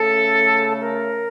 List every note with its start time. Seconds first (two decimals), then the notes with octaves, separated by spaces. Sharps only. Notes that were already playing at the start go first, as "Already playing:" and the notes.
Already playing: C#3 A3 C#4 A4
0.80 A#4